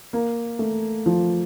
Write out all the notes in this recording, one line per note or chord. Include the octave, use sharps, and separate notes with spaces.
A#3
A3
F3